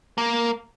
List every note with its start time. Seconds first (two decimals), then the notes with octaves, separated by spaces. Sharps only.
0.18 A#3